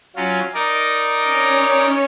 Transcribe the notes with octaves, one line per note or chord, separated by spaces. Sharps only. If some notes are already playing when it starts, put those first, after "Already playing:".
F#3 C#4 F4
D#4 A#4 D5
C#4 C#5